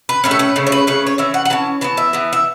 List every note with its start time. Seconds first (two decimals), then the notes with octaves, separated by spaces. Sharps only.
0.09 B4
0.24 A2 A3 C#4 B4
0.31 A4
0.39 B4
0.56 C#3 A3 C#4
0.67 C#5
0.72 B4
0.87 C#3 A3 C#4 B4
1.07 C#5
1.18 E3 C#4 E5
1.34 F#5
1.45 F#5
1.50 E3 C#4 A5
1.81 E3 B3 A5
1.97 E5
2.13 E3 B3
2.33 E5